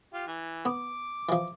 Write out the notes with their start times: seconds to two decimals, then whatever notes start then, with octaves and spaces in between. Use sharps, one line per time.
0.14 F4 G4
0.27 E3
0.65 B3 D6
1.29 E3 F3